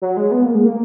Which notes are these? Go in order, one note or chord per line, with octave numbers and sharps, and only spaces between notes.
F#3
G#3
B3
A#3
G#3
A#3